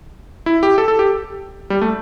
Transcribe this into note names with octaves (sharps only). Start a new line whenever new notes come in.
E4
G4
A4
A4
G4
G3
A3